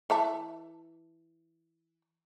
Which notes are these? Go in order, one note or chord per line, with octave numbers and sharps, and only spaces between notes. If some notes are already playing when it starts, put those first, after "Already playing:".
E3 E5 A5